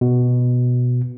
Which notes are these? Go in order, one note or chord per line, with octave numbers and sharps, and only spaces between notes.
B2